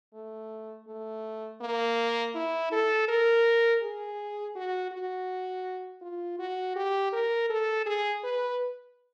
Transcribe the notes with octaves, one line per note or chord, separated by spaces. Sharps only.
A3
A3
A#3
E4
A4
A#4
G#4
F#4
F#4
F4
F#4
G4
A#4
A4
G#4
B4